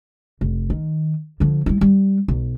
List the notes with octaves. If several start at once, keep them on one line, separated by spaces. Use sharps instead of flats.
F1
D#3
D3 F3
G3 E4
G3
B1